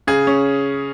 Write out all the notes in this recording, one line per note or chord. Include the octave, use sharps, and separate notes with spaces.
C#3 G#4
C#4